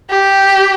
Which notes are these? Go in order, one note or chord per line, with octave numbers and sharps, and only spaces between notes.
G4